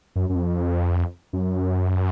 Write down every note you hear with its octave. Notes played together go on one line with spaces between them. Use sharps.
F#2
F#2
F2
F#2